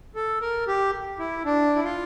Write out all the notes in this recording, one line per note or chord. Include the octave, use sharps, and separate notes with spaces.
A4
A#4
G4
E4
D4
E4
F4